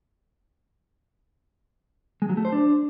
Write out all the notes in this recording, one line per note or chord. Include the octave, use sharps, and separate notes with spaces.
G#3
F#3
A3
C5
D4